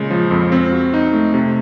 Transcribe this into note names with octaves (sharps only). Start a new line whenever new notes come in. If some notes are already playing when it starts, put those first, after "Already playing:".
Already playing: A#2 C#3 G#3
F3
F2
C4
F#4
D#4
A3
C3